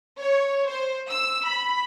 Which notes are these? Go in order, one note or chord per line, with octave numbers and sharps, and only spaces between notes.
C#5
C5
E6
B5